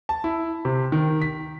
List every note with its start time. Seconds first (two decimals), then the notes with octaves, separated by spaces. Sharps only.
0.09 A5
0.24 E4
0.65 C3
0.92 D#3
1.22 B6